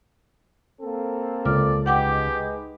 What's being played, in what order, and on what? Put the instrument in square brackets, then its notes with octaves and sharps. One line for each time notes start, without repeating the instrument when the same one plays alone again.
[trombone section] A#3 C4 A4
[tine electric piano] C#2 [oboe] D5 [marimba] F6
[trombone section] G#3 D#4 B4 [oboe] G4 [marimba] F#5 G5 D6